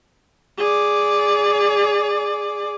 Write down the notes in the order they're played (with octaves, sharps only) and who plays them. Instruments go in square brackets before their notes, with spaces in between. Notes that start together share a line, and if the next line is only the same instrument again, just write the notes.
[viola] G#4 D5